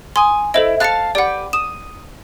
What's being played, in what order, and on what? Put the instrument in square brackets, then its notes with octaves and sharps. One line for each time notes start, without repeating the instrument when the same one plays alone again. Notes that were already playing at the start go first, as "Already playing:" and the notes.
[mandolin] G#5 D#6 [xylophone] C6
[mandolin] E4 [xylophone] A4 C5 D#5
[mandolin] F5 A5 F6 [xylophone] F#6 C#7
[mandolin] G4 B4 [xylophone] D5 F#5
[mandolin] D#6 [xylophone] E7